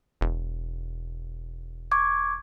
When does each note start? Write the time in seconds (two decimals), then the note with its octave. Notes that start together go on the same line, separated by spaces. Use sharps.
0.21 E1
1.91 C#6 D6 G#6